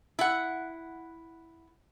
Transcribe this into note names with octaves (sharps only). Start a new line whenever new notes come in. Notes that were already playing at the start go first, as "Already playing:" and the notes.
E4 F#5